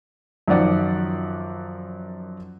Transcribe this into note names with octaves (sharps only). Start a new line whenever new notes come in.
F#2 D#3 F3 D5 F#5